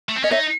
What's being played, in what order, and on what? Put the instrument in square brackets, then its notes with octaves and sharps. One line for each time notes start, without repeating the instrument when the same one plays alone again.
[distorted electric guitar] A3
C4
[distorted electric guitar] C#4 [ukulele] D#5
[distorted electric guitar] D#4 [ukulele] C#5 E5